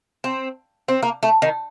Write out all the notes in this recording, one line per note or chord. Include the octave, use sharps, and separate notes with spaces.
C4
C4
A#3
A3
D#3